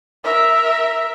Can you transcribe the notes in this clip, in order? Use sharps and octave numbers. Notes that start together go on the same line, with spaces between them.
A#4 E5